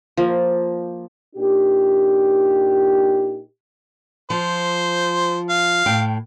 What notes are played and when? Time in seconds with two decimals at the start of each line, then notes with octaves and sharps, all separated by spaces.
0.17 F3 A#3
1.36 A#2 D4 D#4 G4
4.30 F3 C5
5.49 F5
5.86 A2 G5